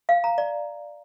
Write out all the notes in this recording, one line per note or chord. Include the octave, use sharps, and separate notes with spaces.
F5
A#5
D5